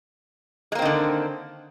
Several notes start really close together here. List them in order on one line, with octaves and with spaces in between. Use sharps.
G#3 A#3 C4 D#3 D3